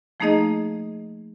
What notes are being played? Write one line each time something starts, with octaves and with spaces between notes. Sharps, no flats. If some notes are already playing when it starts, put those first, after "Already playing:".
F3 A3 A#3 D#4 G#4 D#5